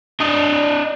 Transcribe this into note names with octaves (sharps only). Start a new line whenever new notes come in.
D4 D#5